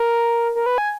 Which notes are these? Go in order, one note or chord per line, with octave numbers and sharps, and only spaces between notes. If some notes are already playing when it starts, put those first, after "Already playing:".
Already playing: A#4
A#4
B4
G#5